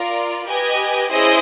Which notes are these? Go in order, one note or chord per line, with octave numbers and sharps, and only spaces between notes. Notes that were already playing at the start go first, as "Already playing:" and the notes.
Already playing: F4 A#4 D5
G4 B4 D#5 G#5
C#4 E4 G#4 C5 D#5